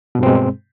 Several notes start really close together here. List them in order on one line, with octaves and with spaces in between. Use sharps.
B2 G2 C4 G#3